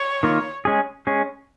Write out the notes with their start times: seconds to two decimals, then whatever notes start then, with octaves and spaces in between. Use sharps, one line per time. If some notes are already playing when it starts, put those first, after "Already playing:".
Already playing: C#5
0.23 D#3 A#3 F4
0.65 G#3 C#4 G#4
1.07 G#3 C#4 G#4